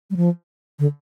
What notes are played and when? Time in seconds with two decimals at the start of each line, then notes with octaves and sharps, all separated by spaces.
0.11 G3
0.17 F3
0.79 D3